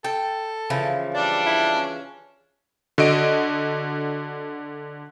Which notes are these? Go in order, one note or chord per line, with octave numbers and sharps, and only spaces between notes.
A4 G5
C#3 E3 F3
G3 D4 D5
E4
C#4
D3 F#4 D#5 D7